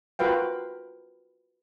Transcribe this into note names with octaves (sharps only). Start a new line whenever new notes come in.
F4 F#4 A#4 B4 F5 G5